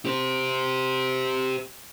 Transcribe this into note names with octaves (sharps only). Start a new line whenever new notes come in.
G4 C5